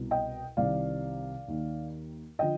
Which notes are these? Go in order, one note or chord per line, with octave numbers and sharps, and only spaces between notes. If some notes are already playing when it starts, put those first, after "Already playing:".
Already playing: C2 B2
D#5 G5
C2 C3 D#3 D5 F5
D#2 D#3
D3 F3 D#5 G5